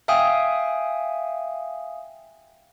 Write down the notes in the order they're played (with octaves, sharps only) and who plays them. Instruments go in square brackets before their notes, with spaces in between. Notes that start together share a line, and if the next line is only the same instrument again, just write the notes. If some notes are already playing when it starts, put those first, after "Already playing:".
[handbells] E5 F5 G5 G#5 D#6